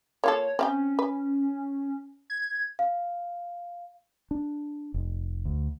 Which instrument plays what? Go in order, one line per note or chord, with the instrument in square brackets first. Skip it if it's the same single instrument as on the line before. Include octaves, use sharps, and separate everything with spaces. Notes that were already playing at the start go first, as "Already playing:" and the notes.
[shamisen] A#3 F4 A4 [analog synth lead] C#5
[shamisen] C4 F5 G5 [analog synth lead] C#4
[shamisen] B4
[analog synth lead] G#6
[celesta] F5
[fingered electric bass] D4
F1
D2